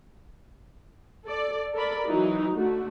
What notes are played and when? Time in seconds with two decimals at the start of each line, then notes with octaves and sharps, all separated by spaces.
1.24 A4 D5
1.74 A4 A#4 D5 B5
2.07 E3 F#3 D#4 E4
2.55 D3 A3 F#4